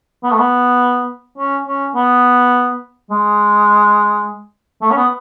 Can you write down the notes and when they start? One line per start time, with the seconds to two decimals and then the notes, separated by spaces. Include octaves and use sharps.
0.23 B3
0.31 A3
0.39 B3
1.38 C#4
1.66 C#4
1.95 B3
3.10 G#3
4.82 A3
4.91 C#4
4.97 B3